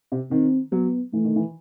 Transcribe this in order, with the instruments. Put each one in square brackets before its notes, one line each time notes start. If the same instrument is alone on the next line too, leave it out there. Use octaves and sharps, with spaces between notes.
[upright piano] C3
[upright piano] D#3 [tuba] C4
[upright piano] F#3 [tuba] B3
[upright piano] E3 [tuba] A3
[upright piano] D#3
E3